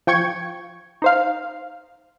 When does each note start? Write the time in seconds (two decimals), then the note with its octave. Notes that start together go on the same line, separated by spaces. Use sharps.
0.07 F3 G5 C#6 G#6
1.02 D#4 C5 F5